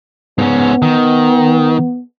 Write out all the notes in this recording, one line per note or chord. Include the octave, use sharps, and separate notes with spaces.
G#2 B3 C#4
D#3